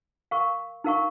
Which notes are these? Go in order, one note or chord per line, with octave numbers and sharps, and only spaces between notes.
A#4 F5 C#6
D#4 A#4 F5 C#6